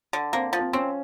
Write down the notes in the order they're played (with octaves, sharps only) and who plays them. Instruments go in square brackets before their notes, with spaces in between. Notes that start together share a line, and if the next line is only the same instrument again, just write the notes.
[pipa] D3
[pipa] A#3 [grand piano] C4
[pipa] F3
[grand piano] C4
[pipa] C4 [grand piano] C#4